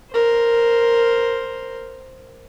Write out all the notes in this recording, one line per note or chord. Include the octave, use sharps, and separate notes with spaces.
A#4 C5